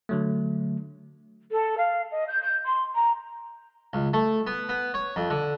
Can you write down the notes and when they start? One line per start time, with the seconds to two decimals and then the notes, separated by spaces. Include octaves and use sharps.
0.09 D3 F#3 A3
1.51 A4
1.77 F5
2.11 D#5
2.27 G6
2.41 G6
2.64 C6
2.94 A#5
3.93 C#2
4.14 A3
4.47 B3
4.69 B3
4.94 C#5
5.16 F2
5.30 D3